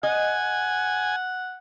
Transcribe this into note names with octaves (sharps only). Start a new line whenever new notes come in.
D#5 F#5 G#5